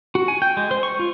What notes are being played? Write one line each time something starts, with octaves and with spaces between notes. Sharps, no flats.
F#4
G#5
G5
G#3
C5
C#6
F4